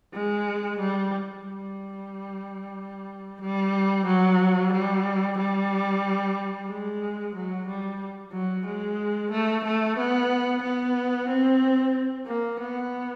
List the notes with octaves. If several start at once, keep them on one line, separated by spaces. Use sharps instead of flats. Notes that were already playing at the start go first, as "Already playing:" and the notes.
G#3
G3
G3
G3
F#3
G3
G3
G#3
F#3
G3
F#3
G#3
A3
A3
B3
B3
C4
A#3
B3